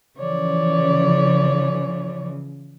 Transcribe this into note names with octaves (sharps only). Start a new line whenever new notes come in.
C#3 E3 F3 C#5 D5